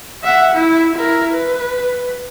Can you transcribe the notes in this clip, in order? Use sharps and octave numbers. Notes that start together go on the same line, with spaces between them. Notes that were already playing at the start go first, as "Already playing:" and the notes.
E5 F#5
E4
E4 A#4
B4